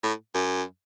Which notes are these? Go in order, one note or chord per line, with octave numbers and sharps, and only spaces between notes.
A2
F#2